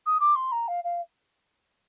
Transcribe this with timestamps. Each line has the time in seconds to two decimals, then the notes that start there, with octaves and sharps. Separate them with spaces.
0.06 D#6
0.20 D6
0.36 C6
0.52 A#5
0.68 F5
0.84 F5